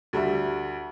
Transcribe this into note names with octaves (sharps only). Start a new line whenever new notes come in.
D2 G3 E5